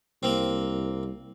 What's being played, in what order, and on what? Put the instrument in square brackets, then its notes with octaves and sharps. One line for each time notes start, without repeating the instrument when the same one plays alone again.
[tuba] C2 [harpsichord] A#3 C4